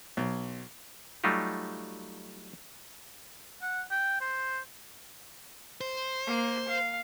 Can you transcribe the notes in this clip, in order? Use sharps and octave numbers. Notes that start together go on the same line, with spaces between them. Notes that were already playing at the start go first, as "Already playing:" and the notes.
B1
F#3 G3 A3 D#4 F4 G4
F#5
G5
C5
C5
A#3
F5